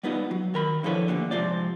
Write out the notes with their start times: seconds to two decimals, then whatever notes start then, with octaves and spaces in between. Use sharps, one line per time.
0.03 G3 B3 D#4 F4
0.31 F#3
0.54 D#3 A#4 B5
0.83 D3 F3 E4 A4 B4 C#5
1.08 D2 G2 A#2 D3
1.31 G#2 C3 F3 C4 D5